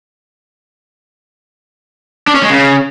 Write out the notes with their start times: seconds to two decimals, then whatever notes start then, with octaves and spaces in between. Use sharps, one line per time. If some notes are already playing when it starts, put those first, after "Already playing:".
2.27 D4
2.35 C#4
2.42 G#3
2.50 C#3